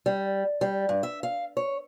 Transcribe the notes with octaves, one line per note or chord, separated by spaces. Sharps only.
G3
G3
G2
E5
F5
C#5